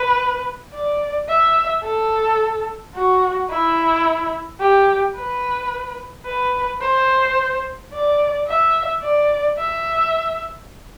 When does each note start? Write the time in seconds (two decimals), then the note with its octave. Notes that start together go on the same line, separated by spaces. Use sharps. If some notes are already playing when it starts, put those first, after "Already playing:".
Already playing: B4
0.74 D5
1.29 E5
1.84 A4
2.95 F#4
3.50 E4
4.61 G4
5.17 B4
6.26 B4
6.81 C5
7.93 D5
8.47 E5
9.02 D5
9.58 E5